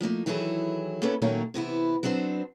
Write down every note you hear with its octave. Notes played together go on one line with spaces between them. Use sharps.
F3 A3 A#3 D#4
D#3 E3 F#3 E4 G#4 A4
A#3 B3 C#4 E4 A4 B4
A#2 D#3 F#3 A3 A#3 C#4
C3 E3 B3 E4
F#3 B3 C4 D4 C5